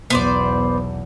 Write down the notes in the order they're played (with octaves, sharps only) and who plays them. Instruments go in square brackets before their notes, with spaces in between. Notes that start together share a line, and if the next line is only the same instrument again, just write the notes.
[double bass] B1 E2 [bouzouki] B3 C5 D5